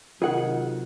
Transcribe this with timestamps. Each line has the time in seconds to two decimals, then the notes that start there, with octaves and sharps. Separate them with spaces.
0.22 C3 D#3 F#3 F4 G#4 F#5